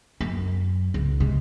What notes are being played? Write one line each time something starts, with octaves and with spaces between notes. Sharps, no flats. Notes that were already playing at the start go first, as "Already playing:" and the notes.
F#2
C#2
C3 G#3